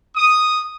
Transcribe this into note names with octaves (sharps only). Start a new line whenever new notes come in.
D#6